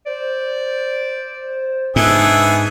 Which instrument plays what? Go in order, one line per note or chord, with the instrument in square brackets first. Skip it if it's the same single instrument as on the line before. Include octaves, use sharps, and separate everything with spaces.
[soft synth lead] C5 [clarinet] D5
[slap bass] G#2 [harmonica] B3 G#4 E5 [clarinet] D4